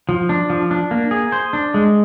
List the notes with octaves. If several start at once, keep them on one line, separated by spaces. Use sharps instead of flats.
F3
D4
F3
D4
A#3
G#4
C5
D4
G#3